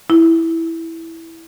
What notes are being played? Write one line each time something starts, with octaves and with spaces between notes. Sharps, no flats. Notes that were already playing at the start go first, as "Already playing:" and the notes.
E4